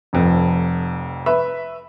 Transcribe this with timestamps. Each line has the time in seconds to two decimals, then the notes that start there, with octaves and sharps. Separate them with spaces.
0.13 F1 F2
1.26 B4 E5 B5